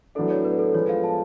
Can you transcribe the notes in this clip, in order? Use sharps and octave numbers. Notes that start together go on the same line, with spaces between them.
A2 F#3 B3 D4 A4
C#5
B4
A4
F3 G#3 B3 C#5
F5
A5